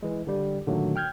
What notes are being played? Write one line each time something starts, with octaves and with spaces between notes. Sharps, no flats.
E3 G#3
D3 G3
A#2 D3 D#3 F#3 A3
G5 F6 G6 G#6